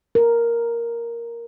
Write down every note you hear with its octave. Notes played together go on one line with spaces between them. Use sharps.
A#4